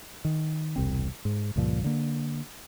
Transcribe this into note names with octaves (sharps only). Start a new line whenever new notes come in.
D#3
E1 C2 C4
G#2
C#2 G2 A#2 F3
D3 A#3